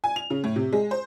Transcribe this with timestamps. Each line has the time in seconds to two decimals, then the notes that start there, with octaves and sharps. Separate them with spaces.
0.04 G#5
0.16 F7
0.30 C#3
0.44 A2
0.56 C3
0.73 G#3
0.91 C5